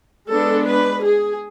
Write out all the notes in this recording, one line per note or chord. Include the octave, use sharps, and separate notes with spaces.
G#3 B3 D4 A4
B4
G#4